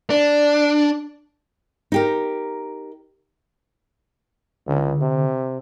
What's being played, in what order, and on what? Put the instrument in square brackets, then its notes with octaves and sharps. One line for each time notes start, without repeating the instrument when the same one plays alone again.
[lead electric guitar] D4
[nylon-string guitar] D#4 G4 A#4
[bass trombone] C#2 [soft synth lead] D3
[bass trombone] C3